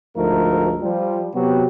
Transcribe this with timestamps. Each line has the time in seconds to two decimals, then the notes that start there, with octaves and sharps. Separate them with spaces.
0.17 D2 G#2 F3 A3 D#4 A#4
0.82 F3 G3
1.35 C3 F#3 B3 F#4 G4